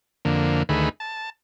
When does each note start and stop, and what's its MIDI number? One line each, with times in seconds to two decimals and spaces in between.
0.25 0.63 41
0.25 0.63 50
0.25 0.63 58
0.69 0.89 38
0.69 0.89 51
0.69 0.89 57
0.69 0.89 68
0.69 0.89 71
1.00 1.30 81